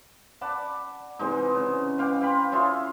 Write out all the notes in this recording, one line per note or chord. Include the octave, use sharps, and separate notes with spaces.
D5 F#5 A5 B5
C3 E3 G#3 D#4
C#3
B4 F5 G5 D6
F5 G5 B5 C6
C#4 E4 F4 G#4